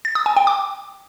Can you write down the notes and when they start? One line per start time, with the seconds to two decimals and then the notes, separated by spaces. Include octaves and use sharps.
0.05 A6
0.15 D#6
0.26 G#5
0.37 G5
0.47 D6